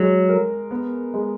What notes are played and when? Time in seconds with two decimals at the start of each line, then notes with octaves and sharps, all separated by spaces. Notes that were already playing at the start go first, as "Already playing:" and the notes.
Already playing: F#3 G#3
0.29 A#4
0.71 B3
1.14 G#3